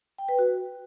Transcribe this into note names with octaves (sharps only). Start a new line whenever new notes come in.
G5
B4
F#4